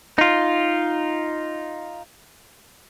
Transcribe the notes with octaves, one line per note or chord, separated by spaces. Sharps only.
D#4 F4